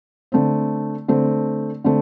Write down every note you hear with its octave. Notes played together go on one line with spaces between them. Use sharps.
D3 A3 C4
D3 A3 C4
D3 A3 C4